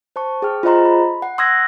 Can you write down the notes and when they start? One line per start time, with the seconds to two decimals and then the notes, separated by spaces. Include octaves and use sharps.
0.16 C5 A5 C#6
0.42 G#4 G5 F6
0.63 F4 G#4 C5 D#5 A#5 C6
0.85 B5
1.22 F#5
1.38 C6 D#6 E6 F#6 G#6 A#6